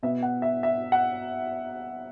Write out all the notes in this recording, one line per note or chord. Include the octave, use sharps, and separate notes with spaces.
B2 B3 E5
F#5
E5
E5
F#5